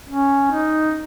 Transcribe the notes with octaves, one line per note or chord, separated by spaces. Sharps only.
C#4
D#4